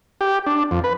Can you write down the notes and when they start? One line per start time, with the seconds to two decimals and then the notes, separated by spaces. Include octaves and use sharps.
0.21 G4
0.46 D4
0.71 F2
0.84 B4